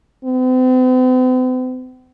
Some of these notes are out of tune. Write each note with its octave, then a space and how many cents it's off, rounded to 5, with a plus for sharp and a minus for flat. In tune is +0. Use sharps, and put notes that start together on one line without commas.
C4 -45